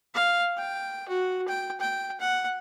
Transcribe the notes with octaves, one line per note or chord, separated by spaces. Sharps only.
F5
G5
F#4
G5
G5
F#5